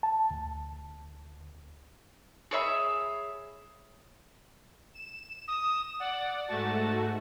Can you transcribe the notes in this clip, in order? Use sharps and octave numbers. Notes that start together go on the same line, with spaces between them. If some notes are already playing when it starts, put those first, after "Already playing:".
A5
D2
G#4 C#5 E5 B5
E7
D#6
D5 F#5
G#2 A3 F#4 A5